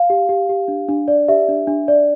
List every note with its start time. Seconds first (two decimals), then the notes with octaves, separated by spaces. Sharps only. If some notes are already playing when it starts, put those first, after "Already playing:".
Already playing: F5
0.10 G4
0.29 G4
0.49 G4
0.68 D4
0.89 D4
1.08 D5
1.28 G4 E5
1.49 D4
1.67 D4
1.88 D5